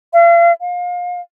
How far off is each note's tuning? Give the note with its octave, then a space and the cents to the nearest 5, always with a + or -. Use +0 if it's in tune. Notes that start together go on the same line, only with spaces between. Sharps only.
F5 -40
F5 +30